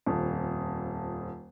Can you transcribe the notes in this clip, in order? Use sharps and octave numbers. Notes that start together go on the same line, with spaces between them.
D#1 F2